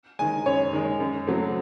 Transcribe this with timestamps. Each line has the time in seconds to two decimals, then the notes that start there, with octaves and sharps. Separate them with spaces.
0.19 D#3 G#3 G#5
0.46 F#2 C#5
0.73 D#3 G#3
1.00 F#2
1.27 C#3 F#3 A3 C4